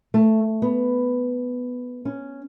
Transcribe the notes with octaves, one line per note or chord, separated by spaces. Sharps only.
A3
B3
C#4